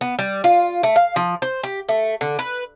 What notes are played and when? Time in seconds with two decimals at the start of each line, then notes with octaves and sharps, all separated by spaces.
0.01 B3
0.19 G3
0.44 F4
0.83 A3
0.96 F5
1.16 F3
1.42 C5
1.63 G4
1.89 A3
2.21 D3
2.39 B4